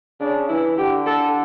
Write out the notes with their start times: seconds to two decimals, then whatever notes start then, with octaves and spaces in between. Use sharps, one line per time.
0.20 C#3 D4
0.49 E3 E4
0.78 D3 G4
1.06 A4